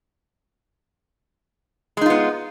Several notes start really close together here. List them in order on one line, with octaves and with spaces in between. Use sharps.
G#3 D#4 F4 B3